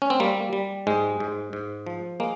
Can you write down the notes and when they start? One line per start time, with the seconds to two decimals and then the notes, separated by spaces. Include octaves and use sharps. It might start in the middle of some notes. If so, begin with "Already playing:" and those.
0.02 C#4
0.10 C4
0.20 G3 A#3
0.53 G3
0.87 G#2 G#3
1.20 G#2
1.53 G#2
1.87 F3
2.20 G#3 A#3